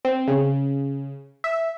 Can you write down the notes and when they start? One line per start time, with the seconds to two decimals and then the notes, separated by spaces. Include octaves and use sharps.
0.05 C4
0.28 C#3
1.44 E5